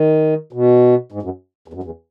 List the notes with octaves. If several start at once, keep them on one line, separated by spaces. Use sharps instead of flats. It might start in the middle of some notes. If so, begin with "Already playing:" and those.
Already playing: D#3
B2
G#2
F#2
E2
F#2
E2